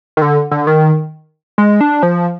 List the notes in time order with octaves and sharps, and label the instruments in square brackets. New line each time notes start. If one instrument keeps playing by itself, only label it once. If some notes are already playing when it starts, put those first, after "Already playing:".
[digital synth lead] D#3
D3
D3
D#3
G#3
D4
F3